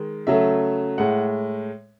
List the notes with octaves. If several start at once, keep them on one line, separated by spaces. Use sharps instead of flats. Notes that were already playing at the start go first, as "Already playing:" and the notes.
Already playing: D#3 G#3
C#3 F#3 A3 E5
A2 G#3 F#5